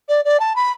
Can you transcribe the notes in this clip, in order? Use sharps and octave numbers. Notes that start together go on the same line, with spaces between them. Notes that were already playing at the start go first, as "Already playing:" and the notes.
D5
D5
A5
B5